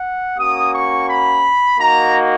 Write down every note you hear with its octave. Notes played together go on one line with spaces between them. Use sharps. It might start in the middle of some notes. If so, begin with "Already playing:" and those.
Already playing: F#5
A#3 C#4 F#4 D#6
C#6
B5
A#3 D#4 F#4 A#5